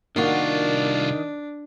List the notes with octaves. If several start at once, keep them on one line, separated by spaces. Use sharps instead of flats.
C2 D#3 A#3 D4 F4 F#4